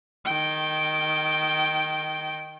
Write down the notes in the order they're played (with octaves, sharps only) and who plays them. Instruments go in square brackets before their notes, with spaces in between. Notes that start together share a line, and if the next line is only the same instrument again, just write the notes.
[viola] D#3 G5